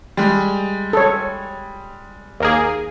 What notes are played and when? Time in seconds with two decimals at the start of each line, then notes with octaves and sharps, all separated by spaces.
0.17 G3 G#3
0.93 A4 C#5
2.40 D#2 A#3 G#4